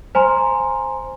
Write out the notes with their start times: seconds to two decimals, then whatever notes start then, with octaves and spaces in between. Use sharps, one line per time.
0.15 C5 G#5 A#5 C6